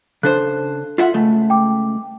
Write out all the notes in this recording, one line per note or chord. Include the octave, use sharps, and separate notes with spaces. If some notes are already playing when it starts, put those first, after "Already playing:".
C#3 D4 A4 C5 F#6
F4 E5 F#5
C#2 A3
G5 D6